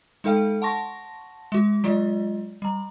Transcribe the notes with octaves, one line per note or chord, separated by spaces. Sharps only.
G#3 D#4 A4 F5 G5
F#5 A5 C6 C#6 A#6
G#3 F#4
F#3 G#3 F4 D#5
G3 A#5